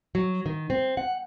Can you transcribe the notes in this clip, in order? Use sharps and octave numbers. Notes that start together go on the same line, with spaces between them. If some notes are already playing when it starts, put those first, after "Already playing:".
F#3
D#3
C4
F#5